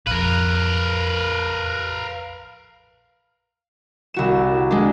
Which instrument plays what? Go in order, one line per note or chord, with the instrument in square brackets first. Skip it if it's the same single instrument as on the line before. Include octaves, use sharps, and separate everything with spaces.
[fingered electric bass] A#1 F2 [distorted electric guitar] A#4 B4 [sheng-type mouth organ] F5
[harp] C2 F#4 E7
G#3 D4